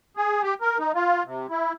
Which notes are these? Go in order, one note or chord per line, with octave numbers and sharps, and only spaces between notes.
G#4
G4
A#4
D#4
F4
C3
E4